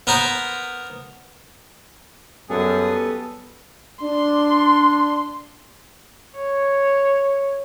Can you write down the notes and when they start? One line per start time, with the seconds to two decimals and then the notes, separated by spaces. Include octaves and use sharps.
0.07 B3 A#4 C5
2.50 F#2 G3 B3 G#4 A4
4.02 D4 C6
6.37 C#5